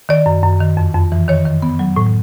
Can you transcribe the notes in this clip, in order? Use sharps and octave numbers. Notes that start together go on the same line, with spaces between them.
D#3 D5
F#2
F#2
D#3
F2
F2
E3
D#3 C#5
D#3
B3
F#3
A2